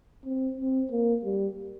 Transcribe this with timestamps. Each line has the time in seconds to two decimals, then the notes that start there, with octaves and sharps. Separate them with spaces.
0.25 C4
0.58 C4
0.91 A#3
1.24 G3